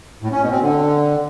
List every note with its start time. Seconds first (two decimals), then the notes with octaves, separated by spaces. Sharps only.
0.22 A2
0.32 C#4
0.42 B2
0.51 C4
0.61 D3